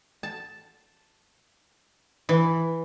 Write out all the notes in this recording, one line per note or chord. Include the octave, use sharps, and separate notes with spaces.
A5
E3